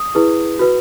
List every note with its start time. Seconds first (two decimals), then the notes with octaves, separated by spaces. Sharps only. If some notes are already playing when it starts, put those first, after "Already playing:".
Already playing: D#6
0.15 E4 G#4 B4
0.59 F#4 B4